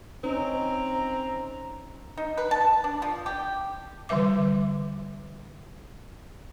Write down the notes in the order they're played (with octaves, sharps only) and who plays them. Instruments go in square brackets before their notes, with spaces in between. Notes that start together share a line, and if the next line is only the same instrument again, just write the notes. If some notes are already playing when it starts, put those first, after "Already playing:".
[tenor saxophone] C4 [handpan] C#4 D#4 [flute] A#5
[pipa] D#4
B4
A5
D4
F3
G4
[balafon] D3 E3 G3 B4 E5 D6